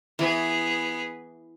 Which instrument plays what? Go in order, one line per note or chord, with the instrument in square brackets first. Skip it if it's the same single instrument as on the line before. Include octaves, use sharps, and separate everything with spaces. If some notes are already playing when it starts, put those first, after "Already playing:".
[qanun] E3 [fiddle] B3 G#4